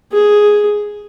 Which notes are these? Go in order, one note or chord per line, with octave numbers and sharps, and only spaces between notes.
G#4